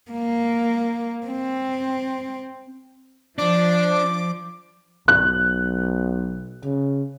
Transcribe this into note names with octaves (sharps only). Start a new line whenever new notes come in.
A#3
C4
F3 D4 D6
B1 F#6
C#3